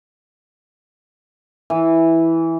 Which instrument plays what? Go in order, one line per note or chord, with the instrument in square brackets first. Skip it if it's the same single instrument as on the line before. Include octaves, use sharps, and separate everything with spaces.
[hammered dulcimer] E3